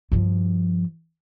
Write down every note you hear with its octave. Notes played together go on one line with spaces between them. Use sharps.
G2 F3